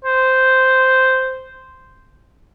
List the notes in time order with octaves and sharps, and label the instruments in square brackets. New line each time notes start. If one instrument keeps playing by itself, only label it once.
[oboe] C5